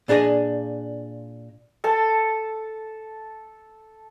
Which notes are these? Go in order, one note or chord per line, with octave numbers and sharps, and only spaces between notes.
A#2 D4 G#4 C#5 D#5
A4 A5